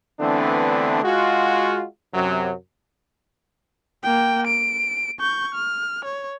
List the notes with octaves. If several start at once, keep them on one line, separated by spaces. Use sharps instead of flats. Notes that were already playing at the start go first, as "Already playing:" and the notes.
D3 E3 A3 B3 C4 D4
G#3 F4 F#4
F#2 C3 F#3
A#3 G5
D7
C#6 G6
F6
C#5